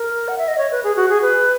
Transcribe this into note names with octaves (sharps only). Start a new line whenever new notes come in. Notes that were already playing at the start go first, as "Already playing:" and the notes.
Already playing: A#4
F#5
E5
D#5
C#5
B4
G#4
F#4
G#4
B4